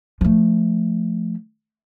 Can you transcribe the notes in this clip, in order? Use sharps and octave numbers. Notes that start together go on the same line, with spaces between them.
F3 A3